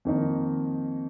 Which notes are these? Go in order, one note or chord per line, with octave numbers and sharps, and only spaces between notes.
F2 D#3 A#3 D#4